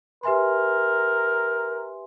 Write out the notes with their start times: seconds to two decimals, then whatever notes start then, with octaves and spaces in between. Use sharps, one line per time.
0.23 G4 A#4 B4 E5 G#5 C6